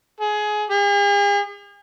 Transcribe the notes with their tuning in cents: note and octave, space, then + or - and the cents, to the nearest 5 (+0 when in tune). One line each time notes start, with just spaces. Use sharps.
G#4 +20
G#4 -45